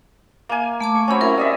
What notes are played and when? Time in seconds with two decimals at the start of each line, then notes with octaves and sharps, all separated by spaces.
0.49 A#3 G#5
0.81 A3 A5 D6
0.95 C#6
1.08 F#3 C4 C#4 C#5 B5
1.21 C#4 E4 A#4
1.37 G3 D#5 E5